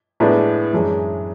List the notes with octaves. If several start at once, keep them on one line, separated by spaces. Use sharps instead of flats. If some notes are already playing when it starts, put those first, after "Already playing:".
A2 G#3 B3 D4
F#2 E3 G#3 D4